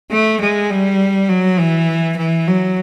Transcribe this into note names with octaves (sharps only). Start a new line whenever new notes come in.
A3
G#3
G3
F#3
E3
E3
F#3